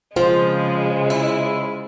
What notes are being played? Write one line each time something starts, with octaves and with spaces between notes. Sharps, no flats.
C#3 F3 G#3 F4 C5
E4